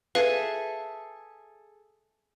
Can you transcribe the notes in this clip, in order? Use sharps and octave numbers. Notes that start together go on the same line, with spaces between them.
G#4 A4 B4 E5 F5